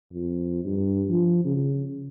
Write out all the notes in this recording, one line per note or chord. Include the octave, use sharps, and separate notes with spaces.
F2
G2
F3
C#3